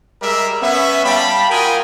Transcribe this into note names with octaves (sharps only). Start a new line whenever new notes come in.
G3 G#3 A#4 E5
B3 C#4 E5
G3 F5 G5 A5 B5
F4 F#4 A#4 G5 G#5 D#6